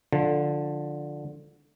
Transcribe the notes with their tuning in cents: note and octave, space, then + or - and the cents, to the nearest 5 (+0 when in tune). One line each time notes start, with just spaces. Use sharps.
D3 +0 F3 +15